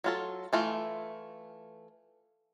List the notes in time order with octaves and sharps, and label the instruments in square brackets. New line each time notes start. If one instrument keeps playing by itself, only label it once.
[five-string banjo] F#3 F4 A4
E3 A3 F4